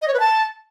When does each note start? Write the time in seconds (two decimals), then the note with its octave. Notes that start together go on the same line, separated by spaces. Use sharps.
0.02 D#5
0.08 C#5
0.14 B4
0.20 A5